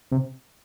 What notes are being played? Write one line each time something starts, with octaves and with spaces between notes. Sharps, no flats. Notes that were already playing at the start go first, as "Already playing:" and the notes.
C3